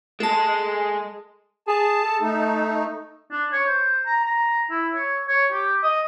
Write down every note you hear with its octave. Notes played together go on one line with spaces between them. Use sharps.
G#3 A4 A5
G#4 A5
A4
A3 D#4
D4
C#5
C5
A#5
A#5
E4
C#5
C#5
G4
D#5